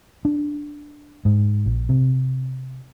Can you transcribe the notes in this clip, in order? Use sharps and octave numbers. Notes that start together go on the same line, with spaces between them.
D4
G#2
A#1
C3